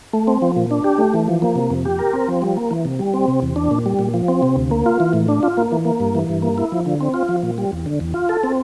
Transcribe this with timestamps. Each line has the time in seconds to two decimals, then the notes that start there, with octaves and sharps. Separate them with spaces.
0.13 A3
0.27 C4
0.42 F3
0.56 A#2
0.71 D4
0.84 G4
0.98 A3
1.14 E3
1.28 F3
1.42 A#3
1.56 C3
1.70 F2
1.85 G4
1.99 A#4
2.13 C4
2.28 F3
2.42 G3
2.57 A#3
2.71 E3
2.85 C3
2.99 G3
3.14 C4
3.28 C3
3.42 E2
3.56 D4
3.71 A#2
3.86 G3
3.99 A#2
4.14 F3
4.28 C4
4.43 C3
4.56 D2
4.71 A#3
4.86 F4
5.00 E3
5.13 A2
5.28 D4
5.43 F4
5.57 A#3
5.72 E3
5.85 A#3
6.00 G2
6.15 E3
6.29 G2
6.42 A#3
6.58 E4
6.72 F3
6.86 D3
7.01 C4
7.14 F4
7.29 F3
7.43 A#2
7.58 G3
7.72 E2
7.86 D3
8.00 E2
8.14 F4
8.29 A4
8.43 C4